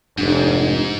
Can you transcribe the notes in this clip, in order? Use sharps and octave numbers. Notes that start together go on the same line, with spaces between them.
F1 G#2 D4